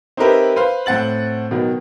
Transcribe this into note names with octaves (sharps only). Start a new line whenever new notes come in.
C4 D#4 E4 G4 A#4 B4
B4 C5 F5
A2 C4 F#5 A6 F#7
B2 D#3 F#3